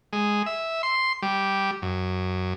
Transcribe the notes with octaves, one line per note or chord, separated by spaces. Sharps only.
G#3
E5
C6
G3
F#2